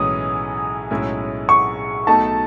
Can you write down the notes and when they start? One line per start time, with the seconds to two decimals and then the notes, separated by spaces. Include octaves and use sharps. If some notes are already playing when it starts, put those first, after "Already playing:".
Already playing: B1 A2 E3 G#3 C#4 D#6
0.91 B1 A2 G#3 C#4 E4
1.49 C#6
2.07 B1 B2 A3 D#4 A5